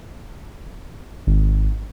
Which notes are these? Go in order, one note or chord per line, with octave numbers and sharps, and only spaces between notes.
G#1